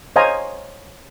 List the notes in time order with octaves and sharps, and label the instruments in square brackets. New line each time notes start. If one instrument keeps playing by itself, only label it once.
[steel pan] C5 C#5 D#5 F5 G#5 A#5